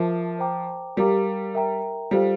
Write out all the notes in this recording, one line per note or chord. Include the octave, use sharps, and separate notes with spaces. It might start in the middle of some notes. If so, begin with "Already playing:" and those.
Already playing: F3 A#4 E5 A5 D6
C5 G5 A#5 D6
G3 G4 A#4 F5 A#5 D6
A#4 E5 G5 A#5
G3 F4 A4 C5 F5